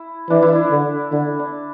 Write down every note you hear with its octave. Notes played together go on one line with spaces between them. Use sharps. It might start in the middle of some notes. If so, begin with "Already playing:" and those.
Already playing: E4
E3 D4
E4
D4
D3
D3 E4
D4